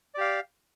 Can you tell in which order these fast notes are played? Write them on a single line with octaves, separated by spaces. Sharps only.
D5 G4 F5